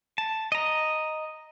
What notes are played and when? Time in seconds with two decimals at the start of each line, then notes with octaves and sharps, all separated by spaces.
0.18 A5
0.52 D#5 A#5